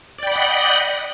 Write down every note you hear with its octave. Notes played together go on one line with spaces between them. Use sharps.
D5 D#5 F#5 G5 B5